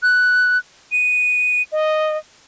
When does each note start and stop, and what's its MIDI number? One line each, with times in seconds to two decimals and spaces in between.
0.03 0.58 90
0.92 1.62 99
1.72 2.17 75